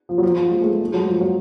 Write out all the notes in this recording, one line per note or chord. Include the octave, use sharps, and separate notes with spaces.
F3
F#3
F3
F3
G#3
A3
G#3
F#3
F3
F#3